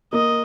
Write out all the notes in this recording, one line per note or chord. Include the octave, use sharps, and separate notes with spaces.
A#3 D#5